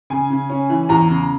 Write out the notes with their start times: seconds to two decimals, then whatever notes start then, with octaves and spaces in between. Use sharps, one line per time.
0.10 C#3 G#5
0.30 C#3
0.50 C#4
0.70 E3
0.89 E2 A#5
1.09 C#3